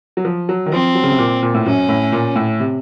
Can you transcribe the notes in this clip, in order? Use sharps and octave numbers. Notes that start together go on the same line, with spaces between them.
F#3
F3
F#3
D#3
F3 C4
F#3
C#3
C3
A#2
A#2
A2
F#2 C#4
A2
A#2
A2
C3